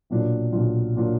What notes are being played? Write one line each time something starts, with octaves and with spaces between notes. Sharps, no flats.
B1 A#2 F#3 D4 F4
B1 A#2 F#3 D4 F4
A#2 F#3 D4 F4